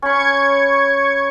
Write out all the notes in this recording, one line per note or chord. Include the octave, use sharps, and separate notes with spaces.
C#4 B5 C#6 G#6 C#7